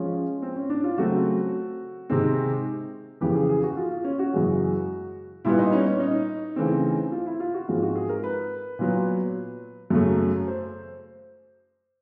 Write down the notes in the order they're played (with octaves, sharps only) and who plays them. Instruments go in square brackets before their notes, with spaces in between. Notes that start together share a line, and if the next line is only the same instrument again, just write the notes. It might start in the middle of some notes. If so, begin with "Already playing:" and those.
Already playing: [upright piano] F3 G#3 C#4
C4
C#4
D4
F4
C#3 F#3 A3 C4 F#4
C3 D#3 G#3 C4
F2 C#3 E3 G4
G#4
G#4
F#4
F4
F4
C#4
F#4
F#2 C#3 E3 G#3
A#2 G3 B3 E4
D#4
C#4
C#4
D#4
C#3 E3 A3 C4
F4
E4
F4
F#4
G#2 F3 G#3 C4 F4
F#4
G#4
A#4
B4
A#2 F#3 B3
F#2 C#3 F#3 A3
C5